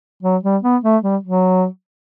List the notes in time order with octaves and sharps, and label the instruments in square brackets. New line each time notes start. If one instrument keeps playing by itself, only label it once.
[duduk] F#3
G3
B3
A3
G3
F#3